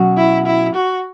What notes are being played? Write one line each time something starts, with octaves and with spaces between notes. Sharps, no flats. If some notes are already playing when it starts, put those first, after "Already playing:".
Already playing: B2 F#3 C#4 F#4
E4
E4
F#4